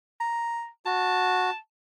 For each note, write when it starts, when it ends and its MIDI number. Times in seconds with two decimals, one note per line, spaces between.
0.20 0.68 82
0.86 1.50 66
0.86 1.56 81